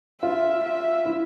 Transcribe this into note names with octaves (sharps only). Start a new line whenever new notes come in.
F4 E5
E5
E4